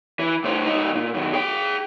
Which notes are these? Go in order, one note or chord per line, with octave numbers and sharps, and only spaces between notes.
E3
A2 C5
C#2 D#4
A#2
F#2 D#3
G#4 G5